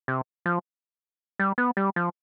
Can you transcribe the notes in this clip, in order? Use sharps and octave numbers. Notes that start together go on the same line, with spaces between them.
C3
F3
G3
B3
G3
F3